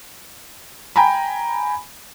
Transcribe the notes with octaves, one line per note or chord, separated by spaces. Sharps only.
G5 G#5 A#5 B5